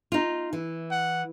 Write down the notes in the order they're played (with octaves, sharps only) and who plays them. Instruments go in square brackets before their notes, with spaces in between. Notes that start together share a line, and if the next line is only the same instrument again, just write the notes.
[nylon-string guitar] D#4 F4
E3
[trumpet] F#5